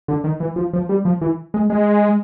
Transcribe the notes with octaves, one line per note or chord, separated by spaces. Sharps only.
D3
D#3
E3
F3
F3
G3
F3
E3
G#3
G#3